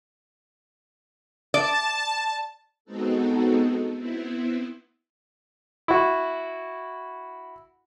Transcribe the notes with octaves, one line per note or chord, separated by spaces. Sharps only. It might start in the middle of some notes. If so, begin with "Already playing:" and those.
D5 A5
G#3 B3 C4 D#4 F#4 A4
B3 C4 E4
E4 F#4